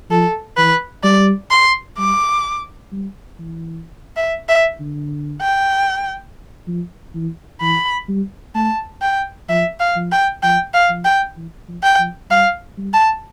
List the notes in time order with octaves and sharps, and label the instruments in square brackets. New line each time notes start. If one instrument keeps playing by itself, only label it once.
[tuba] F3 [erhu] A4
[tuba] E3 [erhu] B4
[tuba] G3 [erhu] D5
[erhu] C6
[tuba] G3 [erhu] D6
[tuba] G3
E3
[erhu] E5
E5
[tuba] D3
[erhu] G5
[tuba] F3
E3
[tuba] E3 [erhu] B5
[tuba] G3
[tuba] A3 [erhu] A5
[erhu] G5
[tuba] F3 [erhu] E5
[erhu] F5
[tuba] F3
[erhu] G5
[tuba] F3 [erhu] G5
[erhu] F5
[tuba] F3
[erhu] G5
[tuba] E3
F3
[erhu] G5
[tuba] F3
[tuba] G3 [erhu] F5
[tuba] G3
[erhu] A5